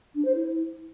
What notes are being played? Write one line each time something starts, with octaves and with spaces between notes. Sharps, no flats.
D4
C5
E4